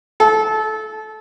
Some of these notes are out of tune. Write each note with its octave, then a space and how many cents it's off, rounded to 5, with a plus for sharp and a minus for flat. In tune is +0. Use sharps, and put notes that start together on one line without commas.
A4 -25